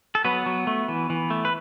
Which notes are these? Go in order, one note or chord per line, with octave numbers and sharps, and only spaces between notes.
A4
F#3 B3 B4
F#3
A3
E3
E3
A3
B4